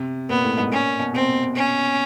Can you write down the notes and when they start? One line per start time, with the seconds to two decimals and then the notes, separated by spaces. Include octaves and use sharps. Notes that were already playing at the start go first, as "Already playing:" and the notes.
Already playing: C3
0.29 A#2 B3
0.43 A2
0.58 G#2
0.71 A#2 C#4
0.99 B2
1.13 C3 C4
1.55 C#4